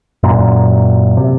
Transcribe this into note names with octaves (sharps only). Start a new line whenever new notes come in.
F#2 A#2
C3